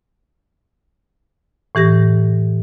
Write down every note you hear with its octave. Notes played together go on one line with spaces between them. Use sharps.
A2 E3 G4 A#6